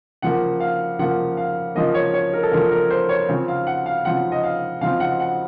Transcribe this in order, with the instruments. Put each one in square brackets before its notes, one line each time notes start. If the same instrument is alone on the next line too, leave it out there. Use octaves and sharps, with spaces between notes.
[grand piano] C#3 F3 A#3 F#5
F5
C#3 F3 A#3 F#5
F5
C#3 F3 A#3 D#5
C#5
C#5
A#4
A4
C#3 F3 A#3 A#4
A#4
C5
C#5
C#3 F3 C4
F5
F#5
F5
C#3 F3 C4 F#5
D#5
F5
C#3 F3 C4 F5
F#5
F#5